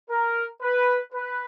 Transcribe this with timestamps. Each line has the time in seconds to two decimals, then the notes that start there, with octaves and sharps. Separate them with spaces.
0.10 A#4
0.62 B4
1.13 B4